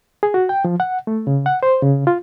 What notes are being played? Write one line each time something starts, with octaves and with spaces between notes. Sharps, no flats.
G#4
F#4
G5
F3
F#5
A3
C#3
F#5
C5
C#3
F4